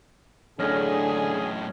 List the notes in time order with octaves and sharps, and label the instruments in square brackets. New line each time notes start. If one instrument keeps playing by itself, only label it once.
[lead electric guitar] F#2 A2 [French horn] D3 [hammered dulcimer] C#4 D#5 [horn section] G#4